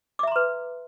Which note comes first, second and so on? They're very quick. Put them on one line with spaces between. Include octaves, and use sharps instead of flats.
D6 E5 A#5 C6 B4